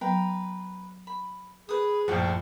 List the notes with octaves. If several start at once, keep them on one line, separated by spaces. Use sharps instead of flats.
F#3 B3 B4 G5 A#5
B5
G#4 B4 D#6
A#1 F#2 A2 F3 F#5 G5 D6